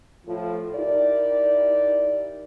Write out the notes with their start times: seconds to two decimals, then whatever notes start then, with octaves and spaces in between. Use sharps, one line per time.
0.25 A2 F3 F4
0.75 D#4 E4 G4 A#4 D5